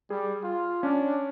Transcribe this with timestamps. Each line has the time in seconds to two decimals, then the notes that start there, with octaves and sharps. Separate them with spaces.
0.10 G3 G#4
0.43 F4
0.83 C#4 D4